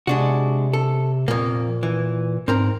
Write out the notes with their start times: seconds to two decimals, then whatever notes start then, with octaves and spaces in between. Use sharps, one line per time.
0.07 C3 G#3 D4 F#4
0.73 A4
1.28 F2 A#2 A#3
1.83 E3
2.48 G#2 C4 A#4 A#5